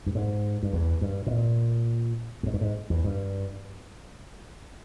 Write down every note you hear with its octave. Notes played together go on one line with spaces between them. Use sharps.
G2
G#2
G2
E2
G2
B2
A#2
G2
G#2
G2
G#2
E2
G2